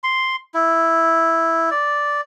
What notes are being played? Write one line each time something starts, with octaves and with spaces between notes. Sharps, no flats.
C6
E4
D5